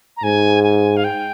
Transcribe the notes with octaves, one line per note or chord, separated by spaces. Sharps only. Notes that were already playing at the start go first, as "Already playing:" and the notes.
A#5
G#2 G#5
G#5
F5
G5